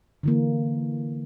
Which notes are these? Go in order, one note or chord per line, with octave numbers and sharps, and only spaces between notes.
D3 E3 A#3